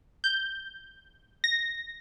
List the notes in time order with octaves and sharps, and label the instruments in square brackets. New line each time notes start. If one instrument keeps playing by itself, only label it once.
[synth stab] G6
A#6